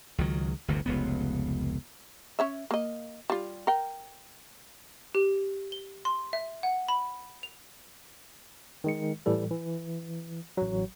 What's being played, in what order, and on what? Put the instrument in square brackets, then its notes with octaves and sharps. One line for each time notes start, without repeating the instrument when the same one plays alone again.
[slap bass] C#2 D#3 F#3
G1 D2 C3
F1 C#2 B3
[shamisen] C#4 C#5 E5
A#3 D#5
G3 F4
A#4 G5
[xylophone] G4
G7
C6
E5
F#5
B5
F7
[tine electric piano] D#3 G#3 C#7
A2 E3 G3 A4
E3
A1 F#3